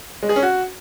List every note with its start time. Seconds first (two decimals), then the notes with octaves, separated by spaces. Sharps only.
0.23 G#3
0.29 G#4
0.36 C#4
0.43 F#4